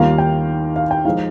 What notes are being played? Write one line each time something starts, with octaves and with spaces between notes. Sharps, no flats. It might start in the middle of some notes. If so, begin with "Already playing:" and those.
Already playing: D#2 D#3 G3 A#3 F4 F5
G5
F5
G5
F3 G#3 D#4 F5